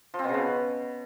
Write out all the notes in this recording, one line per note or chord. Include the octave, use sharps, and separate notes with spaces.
F3
C4
B2
C#3
B2